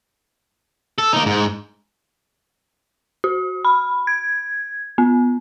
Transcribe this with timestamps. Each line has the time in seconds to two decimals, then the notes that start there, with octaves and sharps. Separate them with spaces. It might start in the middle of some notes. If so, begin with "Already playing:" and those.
0.98 A4
1.13 A#3 D#4
1.26 G#2
3.24 F#4
3.65 B5
4.07 G#6
4.98 B3